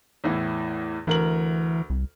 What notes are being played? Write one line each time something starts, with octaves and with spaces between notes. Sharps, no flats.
E2 A2 E3
D2 E3 A#4 F#7
C2